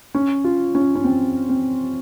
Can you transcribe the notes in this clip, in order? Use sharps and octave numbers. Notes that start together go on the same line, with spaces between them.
C#4
F4
C#4
C#4
C4
C4